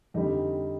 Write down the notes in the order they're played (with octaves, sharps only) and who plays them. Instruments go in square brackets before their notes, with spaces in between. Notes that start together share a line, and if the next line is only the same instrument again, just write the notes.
[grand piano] F2 D3 G3 D#4